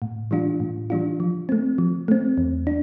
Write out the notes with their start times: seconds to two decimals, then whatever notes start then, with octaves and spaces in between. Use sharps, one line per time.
0.02 A2
0.31 E3 G3 D4 F4
0.60 A2
0.90 E3 G3 D4 F4
1.20 F3
1.49 A3 C4
1.78 F3
2.08 A3 C4
2.38 E2
2.67 D4